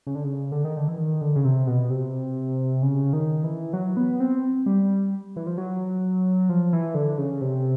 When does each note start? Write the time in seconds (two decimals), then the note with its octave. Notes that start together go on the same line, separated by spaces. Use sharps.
0.07 C#3
0.15 D3
0.24 C#3
0.52 D3
0.65 D#3
0.77 D3
0.88 E3
0.98 D#3
1.21 D3
1.35 C#3
1.45 C3
1.67 B2
1.90 C3
2.82 C#3
3.13 D#3
3.44 E3
3.73 F#3
3.97 B3
4.20 C4
4.66 G3
5.36 E3
5.47 F3
5.58 F#3
6.49 F3
6.73 E3
6.95 D3
7.18 C#3
7.41 C3